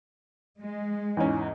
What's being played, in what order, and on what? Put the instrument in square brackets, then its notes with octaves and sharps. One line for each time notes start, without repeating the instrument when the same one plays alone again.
[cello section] G#3
[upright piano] E2 G#2 C#4